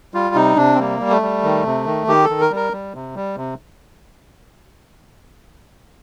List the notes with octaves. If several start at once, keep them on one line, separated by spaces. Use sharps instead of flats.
G3 F4
C3 D#4
C3 D4
C4
G3 A#3
G3
A3
G3
D#3
C3
D#3
D#3 G4
A4
D#3
A#4
G3
A#4
G3
C3
G3
C3